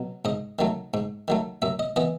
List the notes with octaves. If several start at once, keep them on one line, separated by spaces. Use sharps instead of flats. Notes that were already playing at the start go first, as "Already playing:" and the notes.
Already playing: B2 F#3
G#2 D#5
D#3 F#3 A3
G#2
D#3 F#3 A3
F#2 E5
D#5
E3 B3 D#5